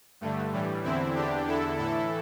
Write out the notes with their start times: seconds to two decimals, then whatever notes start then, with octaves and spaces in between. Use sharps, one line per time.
0.21 G2 D3 A3
0.53 A2 E3 G3
0.83 E2 D3 C4 E4
1.15 E2 D3 D4 G4
1.46 E2 D3 E4 A4
1.78 A2 E3 E4 A4